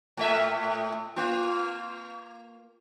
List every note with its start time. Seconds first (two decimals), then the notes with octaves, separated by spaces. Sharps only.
0.17 A2 A3 E5
1.16 A#3 F4